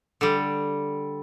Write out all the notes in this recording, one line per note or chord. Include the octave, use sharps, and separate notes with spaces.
D3 G3